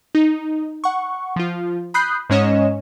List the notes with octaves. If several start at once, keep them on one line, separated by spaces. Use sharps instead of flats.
D#4
F#5 C#6
F3 F4
B5 D#6 F#6 G6 C7
G#2 G#3 C#4 C#5 D#5 E7